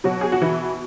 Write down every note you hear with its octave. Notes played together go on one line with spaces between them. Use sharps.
B2 F#3 F#4
G#4
F#4
E3 E4